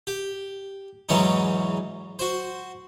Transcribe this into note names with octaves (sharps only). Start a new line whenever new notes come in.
G4
E2 G#2 E3 F#3 C#4 D#4
F#4 C5